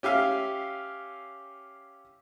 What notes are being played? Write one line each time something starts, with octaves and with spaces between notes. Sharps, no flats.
C#4 G4 E5 F5